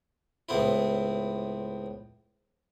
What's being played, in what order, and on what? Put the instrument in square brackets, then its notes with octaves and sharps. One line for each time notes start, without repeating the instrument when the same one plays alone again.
[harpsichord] C#2 A2 B3 C4 E4